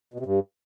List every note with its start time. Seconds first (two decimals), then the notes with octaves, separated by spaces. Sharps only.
0.14 B2
0.20 C3
0.26 G2